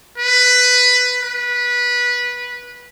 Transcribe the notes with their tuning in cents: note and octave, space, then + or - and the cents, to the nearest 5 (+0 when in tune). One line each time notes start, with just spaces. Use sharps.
B4 +10
B4 -15